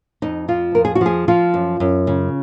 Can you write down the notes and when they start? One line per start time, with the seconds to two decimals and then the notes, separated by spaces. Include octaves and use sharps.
0.22 F2 D#4
0.48 F3 F4
0.75 F2 A#4
0.85 G#4
0.95 F#4
1.01 F3 G#4
1.28 F3 F4
1.54 F#2
1.80 F#2
2.07 C#3